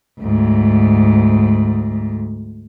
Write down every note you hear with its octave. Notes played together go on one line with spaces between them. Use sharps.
D2 G#2